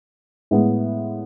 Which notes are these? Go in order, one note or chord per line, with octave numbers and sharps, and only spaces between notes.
A2 G#3 B3